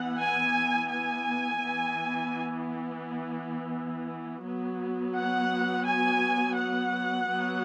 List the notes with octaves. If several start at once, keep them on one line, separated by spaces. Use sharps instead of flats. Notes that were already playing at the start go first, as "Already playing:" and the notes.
Already playing: E3 B3 F#5
G#5
G#5
E3 B3
F#3 B3
F#5
G#5
F#5
F#3 B3